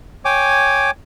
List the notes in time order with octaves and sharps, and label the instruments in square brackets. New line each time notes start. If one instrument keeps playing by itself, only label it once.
[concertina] C#5 G5 G#5 D6